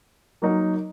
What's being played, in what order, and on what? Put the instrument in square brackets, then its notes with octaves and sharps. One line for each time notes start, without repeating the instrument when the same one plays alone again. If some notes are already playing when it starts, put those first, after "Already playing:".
[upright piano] F#3 A#3 D#4 F#4 A#4